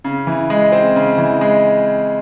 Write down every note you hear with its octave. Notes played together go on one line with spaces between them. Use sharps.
C#3
E3
G#3
C4
C#3
E3
G#3